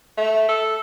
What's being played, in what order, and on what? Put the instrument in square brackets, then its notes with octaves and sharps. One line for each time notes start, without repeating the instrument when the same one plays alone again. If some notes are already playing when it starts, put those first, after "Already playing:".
[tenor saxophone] A3
A4